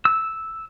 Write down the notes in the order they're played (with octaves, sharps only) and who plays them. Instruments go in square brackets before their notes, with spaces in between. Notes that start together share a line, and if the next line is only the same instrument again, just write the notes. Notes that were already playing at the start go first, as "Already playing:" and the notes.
[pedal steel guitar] E6